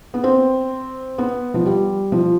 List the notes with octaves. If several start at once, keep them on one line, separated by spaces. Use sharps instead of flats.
B3
C4
B3
F3
G3
F3